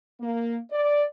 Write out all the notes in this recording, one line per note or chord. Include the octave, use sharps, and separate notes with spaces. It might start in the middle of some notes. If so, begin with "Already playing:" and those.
A#3
D5